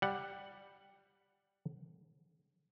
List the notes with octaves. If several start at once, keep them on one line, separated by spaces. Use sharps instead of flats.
G3 F#5